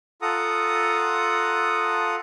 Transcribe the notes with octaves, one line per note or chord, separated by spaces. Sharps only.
F4 A4 F#5 A#5 D#6